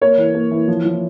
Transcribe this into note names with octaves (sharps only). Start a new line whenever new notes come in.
A#3 C#5
E3
A#3
E3
F3
F3